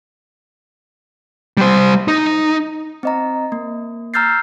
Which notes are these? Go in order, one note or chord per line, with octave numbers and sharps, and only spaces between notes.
G3 C5
D#4
C4 D#5 A#5
A#3
A#5 E6 F6 G6 A6 C7